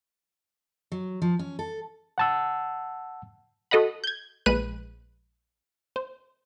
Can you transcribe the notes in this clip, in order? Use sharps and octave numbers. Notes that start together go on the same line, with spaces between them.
F#3
F3
C#4
A4
F#5 A5 E6
F#4 A4 D#5 F#5 B5
G6 G#6
A#1 G#3 B4 B5 F#6 D#7
C5